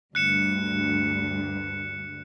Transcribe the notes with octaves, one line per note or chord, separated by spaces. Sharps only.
D2 G2 F#6 C#7 E7